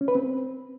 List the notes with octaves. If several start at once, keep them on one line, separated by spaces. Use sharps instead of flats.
C#4
B4
C4